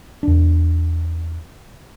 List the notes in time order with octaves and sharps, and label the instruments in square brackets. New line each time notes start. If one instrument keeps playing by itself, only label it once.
[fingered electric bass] E2 D4